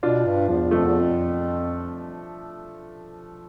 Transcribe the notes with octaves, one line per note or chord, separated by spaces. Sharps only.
B2 D4 F4
G2
E2 F3
F2 F3 A3
E2
F2